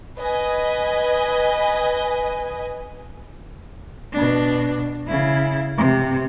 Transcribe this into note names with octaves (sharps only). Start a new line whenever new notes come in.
B4 D#5 G#5
B2 D4
C#3 E4
C3